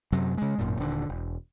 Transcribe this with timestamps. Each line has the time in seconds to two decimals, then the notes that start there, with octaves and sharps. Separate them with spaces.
0.12 F#2 C3 F#3
0.38 C#3 G#3
0.58 G#1 F#2 A#2
0.77 D#1 D3
1.09 E1